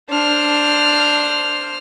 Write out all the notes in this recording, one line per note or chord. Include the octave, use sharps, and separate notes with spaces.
D4 C5 F6